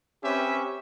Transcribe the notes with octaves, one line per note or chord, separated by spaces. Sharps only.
C4 C#4 G4 B4 E5